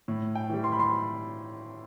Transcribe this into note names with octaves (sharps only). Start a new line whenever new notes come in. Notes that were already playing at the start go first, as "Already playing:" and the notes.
A2
G5
E3 G3
C6
B5
C6